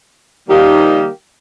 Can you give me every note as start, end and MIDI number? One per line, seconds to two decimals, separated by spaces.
0.49 1.07 51
0.49 1.07 53
0.49 1.07 55
0.49 1.07 58
0.49 1.07 63
0.49 1.07 67